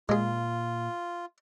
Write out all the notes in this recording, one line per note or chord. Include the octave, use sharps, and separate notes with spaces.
A#2 G#3 F4 G#4